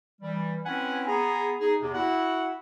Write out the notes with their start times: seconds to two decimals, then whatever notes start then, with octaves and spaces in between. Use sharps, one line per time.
0.21 E3 G3
0.66 C4 C#4 E4 B4 F#5 G#5
1.07 B3 G#4 A#5
1.61 D#4 G#4
1.82 E2 C3
1.94 E4 F#4 F#5